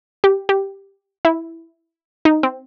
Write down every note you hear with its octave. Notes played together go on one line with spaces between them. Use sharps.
G4
G4
E4
D#4
C4